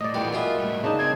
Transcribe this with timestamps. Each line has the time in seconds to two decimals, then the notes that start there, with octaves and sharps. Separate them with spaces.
0.01 A2 D5 D#5
0.14 A#1 E2 F#3 A3 F5 G5
0.33 B2 A#3 F4 G#4 E5
0.59 A2 G3
0.84 C#3 D4 D#4 A5
0.98 C4 G#6